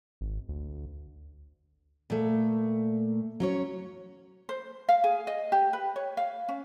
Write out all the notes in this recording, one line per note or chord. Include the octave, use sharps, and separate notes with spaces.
G#1
D2
A#2 A3
F#3 C#4 C#5
C5
F5
G#4
D#5
G4
B4
C#5
F5
C#4